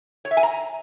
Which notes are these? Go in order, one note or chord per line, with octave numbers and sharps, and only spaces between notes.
C#5
E5
G#5
A#5